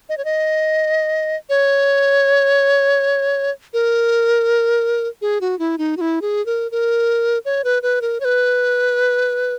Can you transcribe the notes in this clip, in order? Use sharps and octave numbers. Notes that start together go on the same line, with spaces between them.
D#5
C#5
D#5
C#5
A#4
G#4
F#4
E4
D#4
F#4
E4
G#4
A#4
A#4
C#5
B4
B4
A#4
C#5
B4